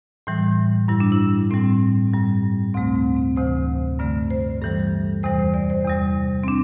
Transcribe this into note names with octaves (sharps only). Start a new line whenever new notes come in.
A2 E3 G3
G2 G3 E4
D4
E4
A2 G3 C4
G2 G3
D2 C3 A3 C4
C4
C4
D2 C3 E3 C5
G2 D3 A3 D5
C5
G2 E3 G3 A4
E2 C3 E3 G3 C5
C5
D5
C5
E2 C3 G3
C4
D4